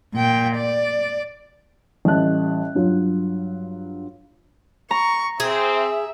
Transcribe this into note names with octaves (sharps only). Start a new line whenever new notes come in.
A#2 G5
D5
A1 G3 D#5 A5 F#6
G2 F#3 F4
A#5 C#6
C4 G#4 E5